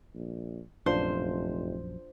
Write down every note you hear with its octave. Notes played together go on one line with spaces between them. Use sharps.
A#1
F1 A#1 F#2 D4 F4 C5